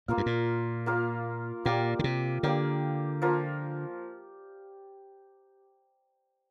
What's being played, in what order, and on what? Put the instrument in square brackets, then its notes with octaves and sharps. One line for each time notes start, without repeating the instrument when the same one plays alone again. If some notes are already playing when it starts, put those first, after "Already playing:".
[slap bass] A#2 [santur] A#3 F4 A#4 F5
[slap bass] G2
A#2
[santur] A#3 F4 A#4 F5
[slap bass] A#2 [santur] A#3 G4 D5 F5
[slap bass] D3
C3
[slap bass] D3 [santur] A#3 G4 D5 F5
[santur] F3 A#3 F4 A#4